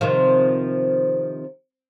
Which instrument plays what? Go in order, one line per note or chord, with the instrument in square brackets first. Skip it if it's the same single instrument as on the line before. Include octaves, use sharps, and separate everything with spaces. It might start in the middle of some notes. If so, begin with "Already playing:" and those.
[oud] C3 D#3 F3